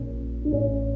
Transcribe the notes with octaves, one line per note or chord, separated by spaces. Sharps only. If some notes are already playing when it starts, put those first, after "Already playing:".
Already playing: A#1 A#2 C#4
D4
A1 A2 C#4